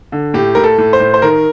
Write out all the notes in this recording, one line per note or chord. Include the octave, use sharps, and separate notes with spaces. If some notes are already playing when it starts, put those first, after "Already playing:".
D3
A2 G4
A2 A#4
A4
A2
C5
A2
C5
D#3 A#4